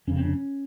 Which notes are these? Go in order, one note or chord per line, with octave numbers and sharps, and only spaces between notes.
F1 F2 C#3 C#4
C4
D4
C#4